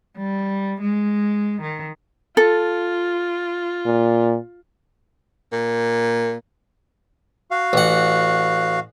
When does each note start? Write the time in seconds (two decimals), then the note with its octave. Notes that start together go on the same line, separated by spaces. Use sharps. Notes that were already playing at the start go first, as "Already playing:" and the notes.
0.17 G3
0.81 G#3
1.62 D#3
2.37 F4 A4
3.86 A#2
5.52 A#2
7.51 F#4 F5
7.73 A1 F#5